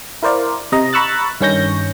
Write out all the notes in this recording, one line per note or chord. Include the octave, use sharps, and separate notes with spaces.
E4 A#4 C5 D5 F5
C3 D#5 A#5
A#5 B5 C#6 E6 F#6 A6
G2 D#3 C#4 C#6 G6 A#6